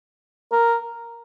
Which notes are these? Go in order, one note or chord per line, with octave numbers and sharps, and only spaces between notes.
A#4